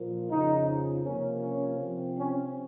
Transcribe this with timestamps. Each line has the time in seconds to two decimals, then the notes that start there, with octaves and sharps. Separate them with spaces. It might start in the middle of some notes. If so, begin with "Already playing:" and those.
Already playing: A#2 F3 A#3
0.30 F2 C#3 F3 D#4
1.04 C3 F3 A#3 C#4
1.41 C#4
1.78 C3 F3 C4
2.15 C#4